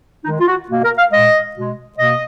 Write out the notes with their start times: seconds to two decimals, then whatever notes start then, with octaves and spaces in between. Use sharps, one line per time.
0.25 D#3 G#3 D#4
0.40 F4
0.47 F#4
0.69 B2 A#3
0.84 A#4
0.98 F5
1.12 A#2 G#3 D#5
1.56 B2 G#3
1.98 B2 A#3 D#5